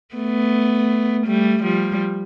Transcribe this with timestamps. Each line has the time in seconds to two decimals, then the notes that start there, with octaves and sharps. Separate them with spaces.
0.15 A3 B3
1.27 G3 A3
1.63 F3 G3